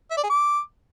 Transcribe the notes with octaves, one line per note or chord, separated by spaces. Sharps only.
E5
D5
G#4
D6